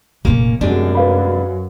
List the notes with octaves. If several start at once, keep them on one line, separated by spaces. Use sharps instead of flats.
F1 A#2 A#3 C4 C#4
F#2 C3 G#3 A3 D4
B4 F5 B5